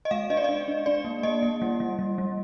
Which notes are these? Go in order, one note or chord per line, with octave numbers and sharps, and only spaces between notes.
D#5
G#3 F5
D4 D#5
D5
D4 D#5
D4
D4 D5
A#3
A#3 D#5
A#3
G3
G3
G3
G3